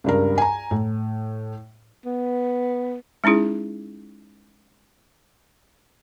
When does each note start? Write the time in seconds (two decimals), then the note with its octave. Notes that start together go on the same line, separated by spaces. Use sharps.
0.04 C#2 G2 A#4
0.38 G#5 A#5
0.71 A2
2.05 B3
3.24 G#3 C#4 D#4 E4 G#4